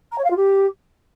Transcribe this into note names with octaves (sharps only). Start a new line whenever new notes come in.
A#5
C#5
F5
F4
G4